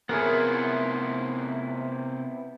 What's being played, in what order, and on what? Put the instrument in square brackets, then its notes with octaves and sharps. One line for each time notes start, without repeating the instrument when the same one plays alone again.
[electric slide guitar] C3 F4 C#5 [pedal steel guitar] B3 E4 [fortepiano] G#4 A#4